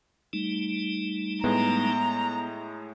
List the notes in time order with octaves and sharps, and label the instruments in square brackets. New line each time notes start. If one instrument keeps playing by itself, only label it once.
[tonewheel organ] G3 A3 D#4
[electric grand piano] A2 G#3 [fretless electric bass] B3 [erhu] A#5